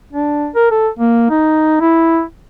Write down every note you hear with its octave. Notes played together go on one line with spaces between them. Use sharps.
D4
A#4
A4
A#3
D#4
E4